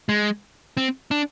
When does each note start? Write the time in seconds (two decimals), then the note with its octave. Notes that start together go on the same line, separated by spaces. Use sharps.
0.09 G#3
0.77 C4
1.11 D4